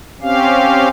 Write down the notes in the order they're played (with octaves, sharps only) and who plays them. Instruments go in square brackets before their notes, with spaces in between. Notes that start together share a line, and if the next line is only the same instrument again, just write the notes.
[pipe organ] C4 C#4 G4 F5